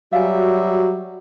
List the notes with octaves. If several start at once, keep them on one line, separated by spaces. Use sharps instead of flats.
F#3 G3 F#4 E5 F5 G#5